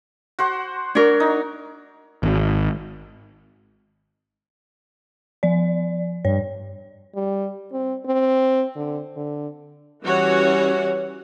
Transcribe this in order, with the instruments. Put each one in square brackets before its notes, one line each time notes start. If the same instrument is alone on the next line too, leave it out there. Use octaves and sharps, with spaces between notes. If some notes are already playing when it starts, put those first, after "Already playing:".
[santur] F#4 C5 F#5
[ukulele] D4 A#4 [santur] C#5
[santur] D#4
[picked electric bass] G#1
[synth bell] F3 D5
[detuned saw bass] G2 [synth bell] C#5
[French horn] G3
C4
C4
D3
D3
[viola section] E3 G3 C#4 F#4 C#5 F#5